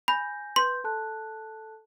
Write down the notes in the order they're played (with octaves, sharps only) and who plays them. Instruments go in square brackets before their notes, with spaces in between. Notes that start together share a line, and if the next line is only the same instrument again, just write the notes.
[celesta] G#5 G6 A#6 [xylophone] B5
[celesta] B4 G6 [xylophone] C6
[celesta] A4 A5 F#6